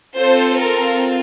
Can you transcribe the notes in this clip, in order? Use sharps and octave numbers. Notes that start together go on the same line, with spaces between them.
C4 F4 A4 C5
A#4